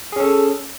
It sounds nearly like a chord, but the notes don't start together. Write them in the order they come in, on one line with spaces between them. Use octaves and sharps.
G#4 C#4 A4